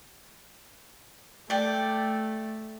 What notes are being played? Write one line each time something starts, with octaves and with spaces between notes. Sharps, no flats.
A3 D5 G5